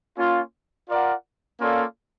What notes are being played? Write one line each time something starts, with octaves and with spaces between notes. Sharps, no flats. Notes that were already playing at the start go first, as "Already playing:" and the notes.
A#3 C#4 F4
F4 A#4 D5 F#5
A#3 C#4 F4 A4 D5